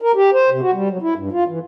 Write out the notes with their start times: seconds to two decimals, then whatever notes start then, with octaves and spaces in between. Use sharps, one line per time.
0.02 A#4
0.16 G4
0.34 C5
0.50 C3
0.62 F#4
0.73 G3
0.90 F#3
1.02 E4
1.17 G2
1.32 F4
1.48 E3